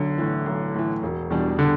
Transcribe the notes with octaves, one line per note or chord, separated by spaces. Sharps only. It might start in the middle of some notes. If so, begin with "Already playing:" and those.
Already playing: B1 D3
A2 E3
B1
A2 E3
E1
E2 B2 G3 D4
D3